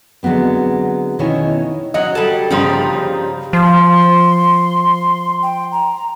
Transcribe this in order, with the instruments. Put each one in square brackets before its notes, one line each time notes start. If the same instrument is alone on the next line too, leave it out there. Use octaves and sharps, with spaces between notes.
[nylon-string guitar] D3 F#3 G#3 B3 C4
B2 D#3 C#4 E4 C#5 G#5
[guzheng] F#3 F#5 [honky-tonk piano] D#5
[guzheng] G3 A5 [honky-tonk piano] A4
[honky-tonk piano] G1 C#3 C6 [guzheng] F3 G3 D#4
[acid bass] F3 [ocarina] C6
[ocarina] G5
A#5